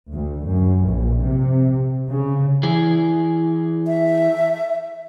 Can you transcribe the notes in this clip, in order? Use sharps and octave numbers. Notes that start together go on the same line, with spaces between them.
D2
F#2
A#1
C3
C#3
E3 E4 G#4
E5